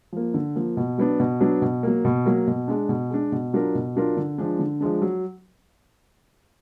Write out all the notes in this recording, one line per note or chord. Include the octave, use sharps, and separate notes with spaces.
F3 A#3
D3
F3 A#3
B2
F#3 B3 D4
B2
F#3 B3 D4
B2
F#3 A#3
B2
F#3 A#3
B2
G#3 D4
B2
G#3 D4
B2
F#3 D4 F4 A#4
B2
F#3 D4 F4 A#4
D3
F3 G#3 D4
D3
F3 G#3 D4
F#3